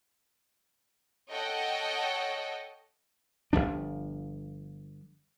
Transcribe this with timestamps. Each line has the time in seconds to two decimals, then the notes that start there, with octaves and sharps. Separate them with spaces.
1.33 A4 C#5 D#5 F#5 G5
3.53 G1 F#2 F3 D4